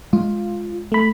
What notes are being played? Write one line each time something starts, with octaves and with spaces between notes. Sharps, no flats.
G#3 F4
A3 B5